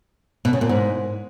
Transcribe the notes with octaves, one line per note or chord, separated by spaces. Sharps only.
B2
C#3
A#2
G#2